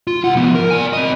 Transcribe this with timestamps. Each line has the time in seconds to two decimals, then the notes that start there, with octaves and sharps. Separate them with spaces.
0.08 F4
0.24 C2 F#5
0.37 F3 B3
0.55 A#4
0.70 D5 G#5
0.93 C4 D#5